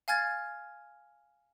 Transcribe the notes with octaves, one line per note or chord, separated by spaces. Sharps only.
F5 G#5 F6 G#6 A6